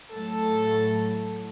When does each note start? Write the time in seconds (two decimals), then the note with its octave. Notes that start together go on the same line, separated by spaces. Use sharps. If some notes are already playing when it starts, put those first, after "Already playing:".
0.12 A2 F#3 A3 A4